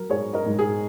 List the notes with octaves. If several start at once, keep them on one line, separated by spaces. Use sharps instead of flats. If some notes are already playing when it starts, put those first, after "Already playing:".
Already playing: F#3 A#4
G#2 G#4 C#5
A#4 D#5
G#2
G#4